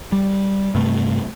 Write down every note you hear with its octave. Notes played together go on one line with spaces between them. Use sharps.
G3
G2 C3 A3